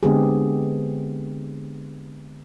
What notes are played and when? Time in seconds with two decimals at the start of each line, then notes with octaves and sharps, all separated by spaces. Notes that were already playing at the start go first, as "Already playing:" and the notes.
0.03 D3 G#3 B3 C4 G4 G#4